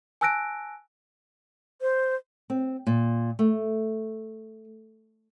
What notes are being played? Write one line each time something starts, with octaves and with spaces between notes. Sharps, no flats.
G#5 A5 E6 F#6 A#6 D7
C5
C4
A#2
A3